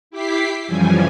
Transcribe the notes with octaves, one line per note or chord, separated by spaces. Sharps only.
E4 G4 D6 B6 C7
F#2 C#3 E3 F3 G3 G#5